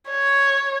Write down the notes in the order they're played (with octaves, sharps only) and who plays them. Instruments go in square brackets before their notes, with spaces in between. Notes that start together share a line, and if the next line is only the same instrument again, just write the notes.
[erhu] C#5